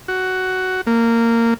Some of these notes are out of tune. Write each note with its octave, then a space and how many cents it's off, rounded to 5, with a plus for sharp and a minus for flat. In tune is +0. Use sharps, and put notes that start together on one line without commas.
F#4 +10
A#3 -15